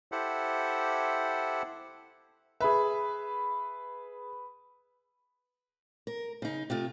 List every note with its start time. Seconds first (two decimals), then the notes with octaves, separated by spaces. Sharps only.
0.12 E4 G4 A4 C5 F#5
2.61 G#4 B4 E5
6.07 A#4
6.42 C#3 D#4
6.70 C3 A3 F4